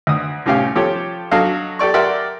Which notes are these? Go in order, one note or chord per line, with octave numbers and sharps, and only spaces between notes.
D2 D#6
C2 A2 C#4 G4 F5
F3 G4 A4 C#5
F#3 D4 A4 D#5 F5
G4 A4 D5 C#6
G4 A#4 D5 E5 F#5 C6